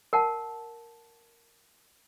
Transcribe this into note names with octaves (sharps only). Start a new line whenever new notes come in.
A#4 F#5 A5